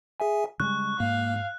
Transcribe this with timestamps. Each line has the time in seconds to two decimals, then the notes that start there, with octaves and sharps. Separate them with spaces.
0.20 G#4 E5 G#5
0.60 C#3 G3 G#3 C#6 F#6
1.00 G#2 A#3 F5